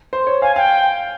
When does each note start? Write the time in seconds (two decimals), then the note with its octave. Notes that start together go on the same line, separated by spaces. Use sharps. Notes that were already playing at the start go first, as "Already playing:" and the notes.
0.13 C5
0.27 C#5
0.42 F5 G#5
0.56 F5 G5